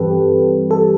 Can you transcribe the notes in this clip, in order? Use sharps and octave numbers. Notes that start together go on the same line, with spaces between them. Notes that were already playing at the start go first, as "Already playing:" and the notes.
Already playing: G2 E3 G3 C4 G4 A4 B4
A4